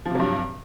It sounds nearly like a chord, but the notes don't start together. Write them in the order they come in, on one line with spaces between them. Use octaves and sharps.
F3 C3 F#3 G2